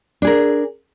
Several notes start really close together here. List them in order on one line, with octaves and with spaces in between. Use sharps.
D4 G#4 A#4